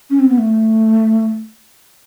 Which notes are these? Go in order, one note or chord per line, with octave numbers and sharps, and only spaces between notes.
C#4
C4
B3
A3